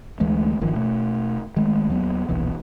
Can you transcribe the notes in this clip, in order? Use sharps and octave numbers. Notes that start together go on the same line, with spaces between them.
D2 E3 G#3 A3
G1 D#3 F3
B2 A3
D#3 G#3 A3
D#2 F#3 B3
D#1 B1 E3